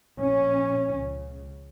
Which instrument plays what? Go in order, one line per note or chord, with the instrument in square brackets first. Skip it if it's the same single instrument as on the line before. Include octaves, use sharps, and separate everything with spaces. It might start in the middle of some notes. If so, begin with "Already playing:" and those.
[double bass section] A#1 A#2 C#4
C#2 C#3